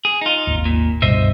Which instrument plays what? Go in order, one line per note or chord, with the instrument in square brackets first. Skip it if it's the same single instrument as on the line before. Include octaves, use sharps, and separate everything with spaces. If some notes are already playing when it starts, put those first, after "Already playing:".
[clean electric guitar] G#4
D#4 F4
[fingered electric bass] G#1 D#2
[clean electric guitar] A#2
[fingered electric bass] C#2 G2 B2 [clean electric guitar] C5 D#5 E5